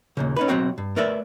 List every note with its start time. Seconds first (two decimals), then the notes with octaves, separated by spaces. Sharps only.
0.17 D#2 A#2 C#3
0.36 C#4 D#4 B4
0.48 B1 F2 F#3 C4 F#4 G5
0.78 G2
0.96 A3 A#4 B4 D5 E5